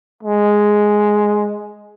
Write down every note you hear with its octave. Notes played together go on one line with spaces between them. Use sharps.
G#3